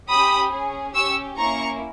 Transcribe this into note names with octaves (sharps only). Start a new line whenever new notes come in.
C#4 G4 B5 D#6
C#4 G#4
C#4 G4 C#6 E6
A#3 C#4 E4 A#5 C#6